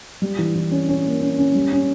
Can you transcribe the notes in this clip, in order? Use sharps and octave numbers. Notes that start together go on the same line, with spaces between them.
G3
E3
E3
C#4
C#4
A#3
C#4
C#4
G3
C#4